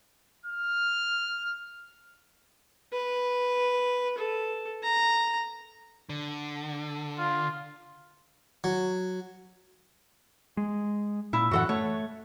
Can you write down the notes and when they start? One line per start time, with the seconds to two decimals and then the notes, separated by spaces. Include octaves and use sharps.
0.45 F6
2.93 B4
4.18 A4
4.83 A#5
6.09 D3
7.18 F4
8.64 F#3
10.57 G#3
11.33 A#2 E4
11.51 F#2 A2 E3 F#4 A4 F#5
11.69 A3 C#5